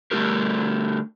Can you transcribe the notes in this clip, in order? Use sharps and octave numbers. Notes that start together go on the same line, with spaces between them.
D3 G3 A3 F4 G4 A#4